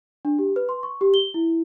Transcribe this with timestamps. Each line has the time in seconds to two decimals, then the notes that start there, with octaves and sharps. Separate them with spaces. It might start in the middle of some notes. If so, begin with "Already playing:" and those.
0.25 D4
0.39 G4
0.56 B4
0.69 C6
0.83 C#6
1.01 G4
1.14 G7
1.34 E4